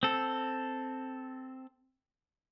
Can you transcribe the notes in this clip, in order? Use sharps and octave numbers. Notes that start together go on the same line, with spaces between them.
C4 A4